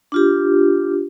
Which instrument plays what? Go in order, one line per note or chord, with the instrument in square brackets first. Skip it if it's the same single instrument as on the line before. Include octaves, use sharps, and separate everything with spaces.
[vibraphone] D4 F4 G4